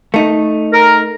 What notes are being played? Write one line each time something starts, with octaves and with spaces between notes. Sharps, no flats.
A3 D#4
A#4